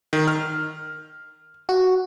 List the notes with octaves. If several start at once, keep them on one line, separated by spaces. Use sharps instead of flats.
D#3
F6
F#4